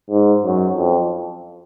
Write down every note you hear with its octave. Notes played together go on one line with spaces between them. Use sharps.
G#2
F#2
F2